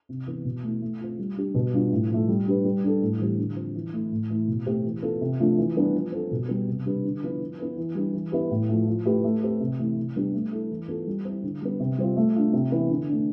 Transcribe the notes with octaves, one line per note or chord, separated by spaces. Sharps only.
C3
E3 B3
B2
A3 E4
A3
C4 F4
G3
D4 G4
B2
G3 D4 F4
A2
F3 A3
G3
D4 G4 B4
G3
D4 A4
A2
E3 G3 C4 G4
D3
F3 C4
E3
A3 E4
A2
E3 A3 E4
B2
A3 C4 G4
E3
B3 F4 A4
C3
F3 A3 D4 F4
E3
G3 B3 D4
F3
C4 F4 A4
B2
G3 B3
C3
G3 D4 G4 B4
D3
F3 B3 E4 B4
F3
B3 E4 B4
E3
G3 D4 G4 B4
E3
B3 E4 G4 B4
A2
F3 A3
F3
A3 E4 G4 B4
A3
C4 G4 B4
C3
E3 A3 E4
C3
G3 B3 D4 G4
A3
E4 A4
E3
B3 F4 A4
G3
C4 E4
D3
G3 B3
C3
G3 C4 F4
A3
D4 F4
C3
E3 B3 E4
D3
A3 D4